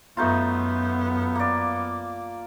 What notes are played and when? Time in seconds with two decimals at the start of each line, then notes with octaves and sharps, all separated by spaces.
0.17 F#2 A3 B3 D#4 F4
1.35 A#3 D5